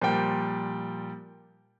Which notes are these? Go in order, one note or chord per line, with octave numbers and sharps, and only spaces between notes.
A#2 F3 G3 G5